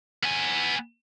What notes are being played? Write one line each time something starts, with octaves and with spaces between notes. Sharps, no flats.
B3 G#5